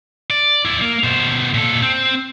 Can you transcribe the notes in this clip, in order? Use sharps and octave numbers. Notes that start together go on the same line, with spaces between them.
D5
E4 D5
A#3 A#4
B2 C5
A#2 A4
C4